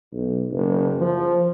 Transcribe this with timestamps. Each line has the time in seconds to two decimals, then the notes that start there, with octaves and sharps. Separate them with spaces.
0.13 B1
0.51 F#1
1.00 F3